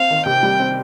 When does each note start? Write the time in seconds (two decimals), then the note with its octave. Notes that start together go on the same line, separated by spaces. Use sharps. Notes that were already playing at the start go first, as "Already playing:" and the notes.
Already playing: C4 F5
0.10 D#3
0.26 C3 G5
0.43 G3
0.60 C4